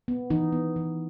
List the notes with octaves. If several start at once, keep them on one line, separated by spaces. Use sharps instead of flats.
B3
E3 D#4
B3
E3